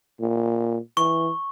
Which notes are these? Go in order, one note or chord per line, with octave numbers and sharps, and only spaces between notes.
A#2
E3 C#6